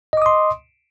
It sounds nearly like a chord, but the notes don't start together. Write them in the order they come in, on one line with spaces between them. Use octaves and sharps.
D#5 D6 D#6 C6